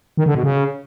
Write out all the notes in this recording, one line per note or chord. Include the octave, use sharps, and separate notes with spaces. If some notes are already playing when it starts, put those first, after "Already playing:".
D#3
D3
B2
C#3